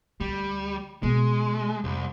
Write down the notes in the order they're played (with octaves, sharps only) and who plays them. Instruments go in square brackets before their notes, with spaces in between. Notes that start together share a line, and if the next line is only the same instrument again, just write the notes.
[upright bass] D2 D3 [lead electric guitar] G3
[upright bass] B2 B3 [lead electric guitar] G#3
[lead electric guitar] C2 [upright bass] F2